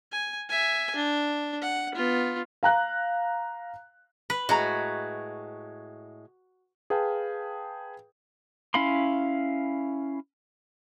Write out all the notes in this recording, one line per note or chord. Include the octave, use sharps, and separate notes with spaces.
G#5
E5 G#5
D4
F#5
B3 F4
F5 A#5 F#6
B4
A2 G#3 F#4 A#5
G#4 B4 F5 G5 A5
C#4 E4 F5 B5 C6